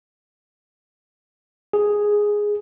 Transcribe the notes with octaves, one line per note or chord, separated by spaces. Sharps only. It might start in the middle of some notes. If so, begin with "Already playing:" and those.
G#4